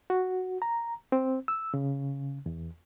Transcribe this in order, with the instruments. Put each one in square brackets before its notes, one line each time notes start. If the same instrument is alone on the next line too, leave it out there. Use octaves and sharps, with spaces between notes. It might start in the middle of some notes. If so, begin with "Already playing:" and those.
[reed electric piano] F#4
A#5
C4
E6
C#3
E2